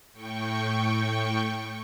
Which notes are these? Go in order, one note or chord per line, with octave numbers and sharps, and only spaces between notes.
A2 G5 C#6